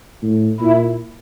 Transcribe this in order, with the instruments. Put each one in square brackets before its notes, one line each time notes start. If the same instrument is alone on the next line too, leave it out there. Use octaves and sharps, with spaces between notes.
[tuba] A2
[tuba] A#2 [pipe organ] E4